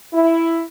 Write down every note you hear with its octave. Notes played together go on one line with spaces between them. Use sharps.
E4